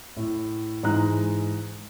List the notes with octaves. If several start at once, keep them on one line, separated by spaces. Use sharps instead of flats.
A2
G#2 E3 G#3 D#4 A#5 F#6